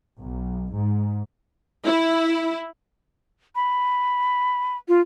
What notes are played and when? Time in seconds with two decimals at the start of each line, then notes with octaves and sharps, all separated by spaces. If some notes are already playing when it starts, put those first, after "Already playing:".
0.20 B1
0.72 G#2
1.86 E4
3.55 B5
4.88 F4